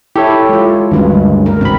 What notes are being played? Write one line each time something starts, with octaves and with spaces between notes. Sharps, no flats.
E4 G4 A4 C#5
G#3 F4
D2 G2 D#3 G#3 C#4
A#4
G#1 C3 C4 B5